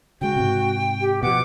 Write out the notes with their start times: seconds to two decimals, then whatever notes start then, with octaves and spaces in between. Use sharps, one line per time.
0.21 C#3 G#3 F#4 G5
0.36 G#2 C3
1.01 G4
1.23 B2 F3 F#5 D6